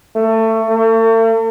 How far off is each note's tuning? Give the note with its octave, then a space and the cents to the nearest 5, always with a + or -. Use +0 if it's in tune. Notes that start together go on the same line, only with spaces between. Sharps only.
A3 +25
A3 +45